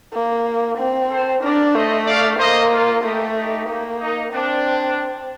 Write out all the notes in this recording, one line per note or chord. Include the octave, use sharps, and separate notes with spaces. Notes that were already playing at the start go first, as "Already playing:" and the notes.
A#3
C4
A4 C5
D4 A#4 D5
A3 C5 D#5
D5 F5
A#3 C5 D#5
F4
A3 D#4 G4
D#4 G4
A#3
D#4
C4 D4